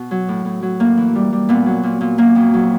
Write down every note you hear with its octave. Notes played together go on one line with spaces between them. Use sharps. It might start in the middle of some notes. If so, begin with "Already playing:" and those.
Already playing: B2
F#3
A2
A2
F#3
A2 A#3
E3
G3
G3
A#2 B3
F#3
A#2
A#2
F#3 A#3
F2
F#3